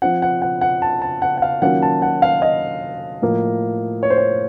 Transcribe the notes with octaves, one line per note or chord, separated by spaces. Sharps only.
F3 C4 F4 F#5
F#5
F#5
F#5
A5
A5
F#5
F#5
F5
D#3 F#3 A#3 C#4 F4 F#5
A5
F#5
F5
D#5
A2 F3 A#3
C#5
C5
C#5